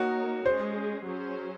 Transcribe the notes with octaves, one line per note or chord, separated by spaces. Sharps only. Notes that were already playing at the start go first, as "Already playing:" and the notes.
Already playing: A#3 D#4 F#4 A#4 C#5
G#3 C#4 G#4 C5
F#3 C#4 G#4 C5